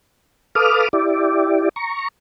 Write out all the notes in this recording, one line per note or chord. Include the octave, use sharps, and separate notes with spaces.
A4 B4 F5 D6 D#6 F6
E4 G4 D5
A#5 C#6